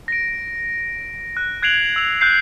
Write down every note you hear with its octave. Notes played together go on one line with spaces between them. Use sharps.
A#6 D7
F#6
F#6 G#6 C7 D7 F7 F#7
E6 F7
F#6 G6 C7